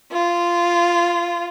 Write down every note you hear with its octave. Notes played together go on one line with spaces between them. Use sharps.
F4